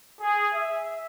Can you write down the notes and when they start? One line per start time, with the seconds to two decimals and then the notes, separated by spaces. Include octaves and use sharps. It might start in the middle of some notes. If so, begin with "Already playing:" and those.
0.21 G#4
0.54 E5